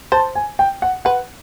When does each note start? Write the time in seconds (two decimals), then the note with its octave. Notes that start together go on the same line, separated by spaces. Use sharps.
0.12 C5 A5
0.35 G#5
0.59 G5
0.82 F#5
1.05 B4 F#5